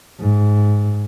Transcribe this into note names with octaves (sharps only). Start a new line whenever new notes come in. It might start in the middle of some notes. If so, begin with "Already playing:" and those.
G#2